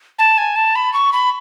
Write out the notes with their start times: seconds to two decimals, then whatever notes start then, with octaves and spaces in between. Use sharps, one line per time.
0.19 A5
0.38 G#5
0.56 A5
0.75 B5
0.93 C#6
1.13 B5